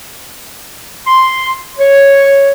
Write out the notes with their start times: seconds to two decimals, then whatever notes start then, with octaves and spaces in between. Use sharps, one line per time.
1.07 C6
1.79 C#5